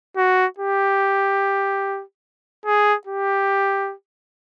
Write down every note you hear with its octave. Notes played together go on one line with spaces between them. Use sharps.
F#4
G4
G#4
G4